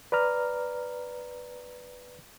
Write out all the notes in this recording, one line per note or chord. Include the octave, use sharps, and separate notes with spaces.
B4 D5 A#5 F6